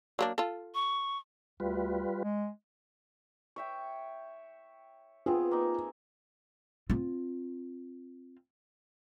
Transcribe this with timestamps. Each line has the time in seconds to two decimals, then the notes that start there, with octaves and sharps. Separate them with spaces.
0.19 F#3 A#3 D4
0.38 F4 A4
0.75 C#6
1.60 D2 G3 F4 B4
2.22 G#3
3.56 C#5 E5 G5
5.26 B3 C4 F4 G#4
5.51 A#3 D#4
6.90 C4 F4